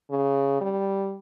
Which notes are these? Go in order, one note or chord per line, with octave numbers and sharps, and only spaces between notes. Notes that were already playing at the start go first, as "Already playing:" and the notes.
C#3
G3